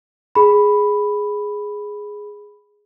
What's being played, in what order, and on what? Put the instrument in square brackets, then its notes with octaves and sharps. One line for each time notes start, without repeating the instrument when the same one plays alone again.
[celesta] G#4 B5